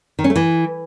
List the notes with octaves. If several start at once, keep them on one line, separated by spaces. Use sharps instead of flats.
D#3
C#4
A3
E3